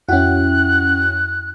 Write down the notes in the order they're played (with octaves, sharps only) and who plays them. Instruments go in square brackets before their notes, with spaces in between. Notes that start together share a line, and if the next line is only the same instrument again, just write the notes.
[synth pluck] F2 E4 G5 [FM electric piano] C#4 F#4 [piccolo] F#6